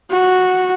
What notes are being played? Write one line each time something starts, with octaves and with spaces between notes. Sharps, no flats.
F#4